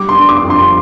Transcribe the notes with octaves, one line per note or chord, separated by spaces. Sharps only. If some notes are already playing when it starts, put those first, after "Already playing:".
Already playing: G3 D6
C6
D4
D6
F2
C6